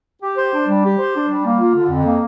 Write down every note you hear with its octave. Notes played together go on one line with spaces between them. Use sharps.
G4
C5
D4
G3
G4
C5
D4
G3
A#3
F4
D3
F2
A#3